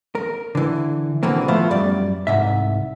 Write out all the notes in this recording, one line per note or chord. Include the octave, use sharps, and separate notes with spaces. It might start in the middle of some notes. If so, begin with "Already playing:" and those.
A#4
D3 E3
B2 D3 E3 A#3 C4
F3 A3 B3 C5 E5 F5
F#2 G3 D5
C2 G#2 E5